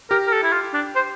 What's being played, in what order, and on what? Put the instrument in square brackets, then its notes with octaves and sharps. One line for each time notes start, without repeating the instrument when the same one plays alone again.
[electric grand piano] G4 [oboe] A#4
[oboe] A#4
A4
E4
F4
D4
C5